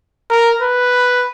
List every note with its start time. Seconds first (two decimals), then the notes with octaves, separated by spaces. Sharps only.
0.31 A#4
0.61 B4